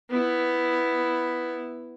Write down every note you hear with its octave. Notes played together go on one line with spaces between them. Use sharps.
B3 E4